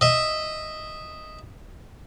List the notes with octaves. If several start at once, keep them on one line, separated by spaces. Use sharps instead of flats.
D#5 E5